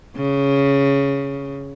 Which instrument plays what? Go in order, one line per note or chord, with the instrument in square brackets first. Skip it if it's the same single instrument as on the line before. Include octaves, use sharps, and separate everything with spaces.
[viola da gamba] C#3